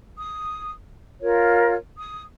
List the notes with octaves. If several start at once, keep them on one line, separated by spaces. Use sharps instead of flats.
D#6
F4 A#4 C#5
D#6